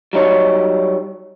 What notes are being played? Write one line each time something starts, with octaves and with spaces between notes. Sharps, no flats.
F#3 G3 D#4 C#5